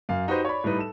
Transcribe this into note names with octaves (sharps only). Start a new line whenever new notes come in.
F#2 F5
D#4 F#4 G4 B4 C5 D#5
C#5 D5 B5
A2 G3 D#4 B4
A4 E7